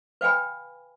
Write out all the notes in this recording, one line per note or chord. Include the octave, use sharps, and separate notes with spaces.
B4 F5 G5 G#5 B5